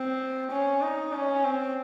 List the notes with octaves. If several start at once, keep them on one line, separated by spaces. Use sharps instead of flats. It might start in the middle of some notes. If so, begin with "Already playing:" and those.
Already playing: C4
C#4
D#4
C#4
C4